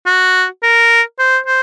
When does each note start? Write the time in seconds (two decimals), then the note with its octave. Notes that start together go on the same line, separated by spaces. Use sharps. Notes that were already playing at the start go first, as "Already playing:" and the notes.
0.06 F#4
0.63 A#4
1.19 C5
1.46 C5